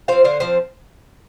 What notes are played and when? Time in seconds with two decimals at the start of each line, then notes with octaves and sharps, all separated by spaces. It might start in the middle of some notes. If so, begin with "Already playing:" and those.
0.08 F3 C4 C5 F5
0.24 D3 C5 F5
0.40 F3 C4 C5 F5